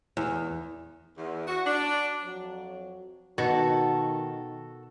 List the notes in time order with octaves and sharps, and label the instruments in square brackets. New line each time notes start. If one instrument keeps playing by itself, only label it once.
[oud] E2
[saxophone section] E2
F#4
D4
[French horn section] F2 F#3 C#5
[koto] B2 [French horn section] D#3 [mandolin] F#4 A4